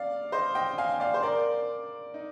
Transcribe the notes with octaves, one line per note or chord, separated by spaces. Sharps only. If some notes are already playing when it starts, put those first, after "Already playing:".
Already playing: D5 F5
C5 D#5
D#5 G5
F5 G#5
D5 F5
C5
A#4 D5
D#4